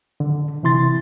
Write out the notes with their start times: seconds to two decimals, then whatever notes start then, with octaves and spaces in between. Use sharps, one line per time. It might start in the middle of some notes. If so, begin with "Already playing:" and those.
0.20 D3
0.63 C3 E3 E4 C6 A6